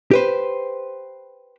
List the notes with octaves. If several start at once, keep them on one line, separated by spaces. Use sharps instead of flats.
G4 B4 C5